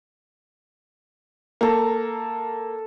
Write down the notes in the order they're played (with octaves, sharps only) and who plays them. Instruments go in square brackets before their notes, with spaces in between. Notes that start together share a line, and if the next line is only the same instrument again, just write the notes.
[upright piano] A#3 [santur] A4 A#5